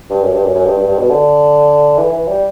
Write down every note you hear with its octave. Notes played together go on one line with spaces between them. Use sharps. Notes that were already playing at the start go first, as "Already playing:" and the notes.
G2
F#2
G2
F#2
F#2
G2
G2
G2
B2
D3
E3
E3
G3